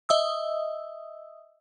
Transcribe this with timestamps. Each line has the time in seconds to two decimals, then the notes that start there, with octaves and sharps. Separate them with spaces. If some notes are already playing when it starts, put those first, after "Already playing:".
0.09 D#5 E5 D#6 E6